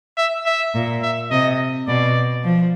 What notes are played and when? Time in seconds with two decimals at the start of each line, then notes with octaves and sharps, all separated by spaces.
0.17 E5
0.46 E5
0.75 A#2
1.03 E5
1.31 C3 D#5
1.88 B2 D5
2.45 F3